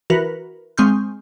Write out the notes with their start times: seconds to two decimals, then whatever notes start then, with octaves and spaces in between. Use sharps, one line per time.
0.10 E3 F#4 A#4 B4
0.78 G#3 C4 C6 C#6 F6 G6